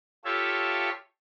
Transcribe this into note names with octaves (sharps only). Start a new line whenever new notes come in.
F4 G4 A4 C#5 E5